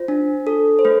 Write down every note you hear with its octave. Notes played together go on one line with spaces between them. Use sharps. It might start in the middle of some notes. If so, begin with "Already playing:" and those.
Already playing: F4 C5
D4
A4
C5
A3 B4